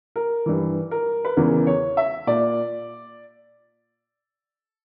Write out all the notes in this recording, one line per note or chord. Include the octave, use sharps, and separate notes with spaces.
A#4
G2 E3
A#4
B4
E2 C#3 E3 A#4
C#5
E5
A#2 D5